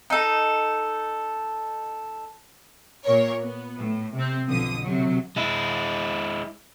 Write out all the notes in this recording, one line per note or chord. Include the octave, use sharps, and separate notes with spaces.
D#4 A4
A#2 A#4 C#5
B3
A2
C3 C4
B1 F2 D3 F3 D#6
C3 F#3
G#3 E4